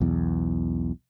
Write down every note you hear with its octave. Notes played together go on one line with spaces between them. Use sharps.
B1 E2